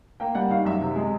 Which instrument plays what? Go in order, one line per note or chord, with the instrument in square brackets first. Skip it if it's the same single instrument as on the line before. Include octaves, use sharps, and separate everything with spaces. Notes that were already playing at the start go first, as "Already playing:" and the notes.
[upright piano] A#3 G5
G3 F#5
D#3 F5
F#2 E5
C3
G#3